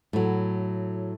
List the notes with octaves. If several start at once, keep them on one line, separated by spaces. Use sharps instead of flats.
A2 F#3